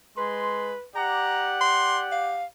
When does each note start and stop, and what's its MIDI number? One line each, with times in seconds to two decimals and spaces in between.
0.18 0.74 56
0.18 0.84 71
0.18 0.74 84
0.96 2.47 67
0.96 2.47 74
0.96 2.47 78
0.96 1.52 82
1.61 1.99 84
2.12 2.45 77